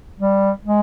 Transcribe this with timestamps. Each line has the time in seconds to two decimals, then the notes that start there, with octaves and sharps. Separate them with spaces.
0.20 G3
0.65 G#3